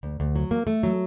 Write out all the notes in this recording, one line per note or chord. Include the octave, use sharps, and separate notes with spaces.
D2
D2
F#3
A#3
A3
F#3